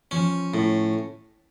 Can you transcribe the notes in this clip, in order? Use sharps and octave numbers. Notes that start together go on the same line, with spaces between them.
F3 C#4
A2